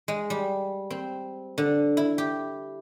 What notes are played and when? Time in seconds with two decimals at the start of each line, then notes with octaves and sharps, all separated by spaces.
0.08 G#3
0.30 G3
0.90 C4
1.58 D3
1.97 E4
2.18 G4